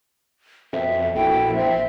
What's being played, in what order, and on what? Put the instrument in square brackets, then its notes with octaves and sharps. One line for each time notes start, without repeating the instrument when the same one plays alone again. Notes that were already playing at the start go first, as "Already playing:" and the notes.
[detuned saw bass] F2 [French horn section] B2 C4 [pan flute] E5
[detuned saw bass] A#1 [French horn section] E4 F#4 A4 [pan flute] G5
[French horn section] C4 [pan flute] E5